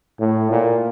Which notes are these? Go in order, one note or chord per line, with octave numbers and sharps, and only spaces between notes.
A2
A#2